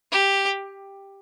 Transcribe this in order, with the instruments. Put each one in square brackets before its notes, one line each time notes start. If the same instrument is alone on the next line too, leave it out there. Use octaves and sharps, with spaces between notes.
[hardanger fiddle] G4